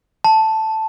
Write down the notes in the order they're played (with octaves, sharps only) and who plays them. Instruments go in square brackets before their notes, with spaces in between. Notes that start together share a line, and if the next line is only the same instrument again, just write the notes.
[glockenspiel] A5